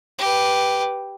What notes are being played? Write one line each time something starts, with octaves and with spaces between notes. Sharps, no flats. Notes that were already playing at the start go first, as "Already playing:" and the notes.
G4 B4